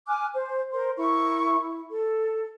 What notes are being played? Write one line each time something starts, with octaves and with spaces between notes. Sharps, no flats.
G#5 D6 F6 F#6
C5
A#4 C5 C6
E4 A#4 C#6
E4
A4